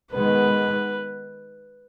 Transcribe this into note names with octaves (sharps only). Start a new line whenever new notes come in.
D#3 G#3 B3 B4